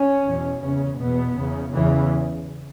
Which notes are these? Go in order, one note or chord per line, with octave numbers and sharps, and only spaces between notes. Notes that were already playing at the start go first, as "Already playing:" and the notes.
Already playing: C#4
E2 B2
E2 C#3 C#4
E2 B2 B3
E2 C#3
E2 C#3 E3